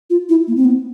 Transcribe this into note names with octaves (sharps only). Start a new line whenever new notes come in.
F4
E4
A#3
C4
B3